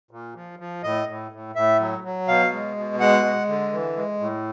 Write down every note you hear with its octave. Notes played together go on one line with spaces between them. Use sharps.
A#2
F3
F3
A2 D#5
A2
A2
A2 E5
F#3
F#3
B2 F5
G#3
B2
G#3 F#5
G#3
D3
E3
G#3
A2